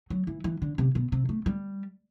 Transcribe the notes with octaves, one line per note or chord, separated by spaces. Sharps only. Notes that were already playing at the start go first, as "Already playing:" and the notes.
F#3
E3
E3
D3
C3
B2
C3
A3
G3